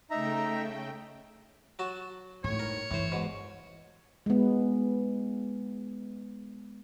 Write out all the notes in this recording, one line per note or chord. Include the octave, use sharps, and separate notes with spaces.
C#3 A3 D#4 E5 G5 A#5
F#3 F#4 A5
G#1 A2 C#5
A#4
G1 A2 E3 C5
G#2 B2
G#3 B3